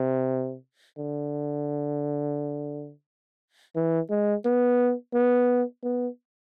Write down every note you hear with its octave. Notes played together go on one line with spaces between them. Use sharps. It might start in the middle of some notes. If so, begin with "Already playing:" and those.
Already playing: C3
D3
E3
G#3
B3
B3
B3